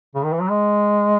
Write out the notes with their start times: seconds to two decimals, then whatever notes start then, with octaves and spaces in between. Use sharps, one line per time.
0.15 C#3
0.24 D#3
0.33 E3
0.41 F#3
0.50 G#3